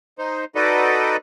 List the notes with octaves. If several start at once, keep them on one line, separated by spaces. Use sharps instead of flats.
D#4 C5
D#4 F#4 A4 B4 D5 D#5